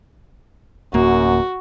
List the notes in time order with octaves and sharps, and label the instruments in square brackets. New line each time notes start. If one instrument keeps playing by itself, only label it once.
[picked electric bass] D1 A#3 [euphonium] F#2 [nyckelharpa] F#4